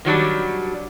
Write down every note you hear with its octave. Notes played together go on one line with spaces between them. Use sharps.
D#3 F#3 G3 D4